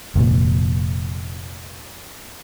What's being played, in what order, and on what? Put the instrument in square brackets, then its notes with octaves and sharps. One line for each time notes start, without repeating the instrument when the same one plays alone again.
[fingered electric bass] F1 A#2